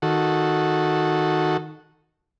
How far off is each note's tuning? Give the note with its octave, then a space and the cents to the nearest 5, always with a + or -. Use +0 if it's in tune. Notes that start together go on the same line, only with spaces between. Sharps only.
D#3 +0 F#4 -10 A4 +0